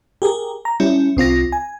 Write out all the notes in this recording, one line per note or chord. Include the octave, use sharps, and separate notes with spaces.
G4 G#4 A#4
A#5
G3 C#4 E4
C2 C4 F4 A#6
G#5